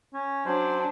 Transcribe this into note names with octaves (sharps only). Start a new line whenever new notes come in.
C#4
F#3 C#4 D4 C5